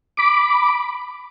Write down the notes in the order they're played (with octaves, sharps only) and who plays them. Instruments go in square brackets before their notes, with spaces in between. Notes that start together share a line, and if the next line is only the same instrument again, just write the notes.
[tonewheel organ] B5 D6